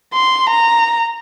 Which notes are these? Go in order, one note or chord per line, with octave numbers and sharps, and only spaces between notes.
C6
A#5